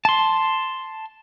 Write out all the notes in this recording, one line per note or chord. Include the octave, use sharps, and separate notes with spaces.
A5 C6